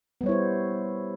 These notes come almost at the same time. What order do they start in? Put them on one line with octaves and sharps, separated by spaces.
B3 G3 C#5 E4 C5